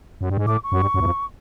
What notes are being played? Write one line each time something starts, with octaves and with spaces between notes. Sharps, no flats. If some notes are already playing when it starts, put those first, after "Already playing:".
F#2
G2
G#2
A2 D6
C#6
F#2
G2
F#2
E2
F2